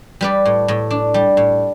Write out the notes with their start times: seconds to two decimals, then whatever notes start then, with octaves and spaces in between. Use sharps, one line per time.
0.21 G3 B4 D5
0.45 A2
0.68 A2
0.90 D4
1.14 G3
1.37 A2